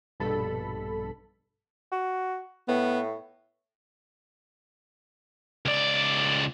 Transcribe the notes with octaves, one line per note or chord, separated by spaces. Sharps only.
A#1 G2 B2 A4 B5
F#4
A2 B3
C#2 D5